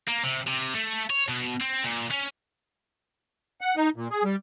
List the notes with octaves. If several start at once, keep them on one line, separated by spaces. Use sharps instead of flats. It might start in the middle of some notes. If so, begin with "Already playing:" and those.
A#3
C3
C3
A3
C#5
B2
C4
A#2
C#4
F#5
D#4
A#2
G#4
G3